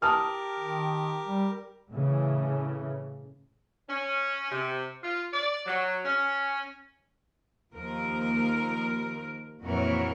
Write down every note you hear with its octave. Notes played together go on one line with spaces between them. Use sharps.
G4 A#4 A5 D#6 F6
D#3
G3
A2 C#3 E3
C#4
C3
F4
D5
F#3
C#4
D#2 F3 A#4
F2 A#2 E3 F#4 A#4 C#5